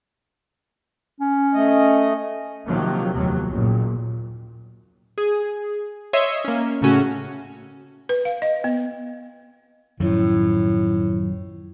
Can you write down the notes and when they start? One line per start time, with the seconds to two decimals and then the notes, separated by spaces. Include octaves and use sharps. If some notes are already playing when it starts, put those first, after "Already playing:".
1.20 C#4
1.54 A3 D#5
2.68 C3 D#3 F3 F#3 A#3
3.14 F1 D#2 B2 F#3
3.49 F#1 A#2
5.18 G#4
6.13 C#5 D#5 E5 C6 D#6
6.44 A#3 C#4
6.81 A2 C#3 A3 C#4 F#4
8.09 B4
8.25 F5
8.42 D#5
8.64 B3
10.00 F#2 A2 D#3 F3